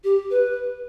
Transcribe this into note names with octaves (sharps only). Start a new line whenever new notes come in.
G4
B4